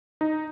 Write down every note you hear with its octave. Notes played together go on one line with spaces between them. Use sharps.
D#4